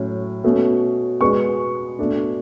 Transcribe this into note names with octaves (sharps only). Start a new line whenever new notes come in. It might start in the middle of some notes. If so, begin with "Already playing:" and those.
Already playing: A2 F#3 C#4
B2 A3 C#4
B2 G#3 B3 C#6
B2 A3 D4